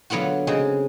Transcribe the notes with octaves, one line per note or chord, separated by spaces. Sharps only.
D3 F#3 B3 F4 F#4
C#3 G#3 C4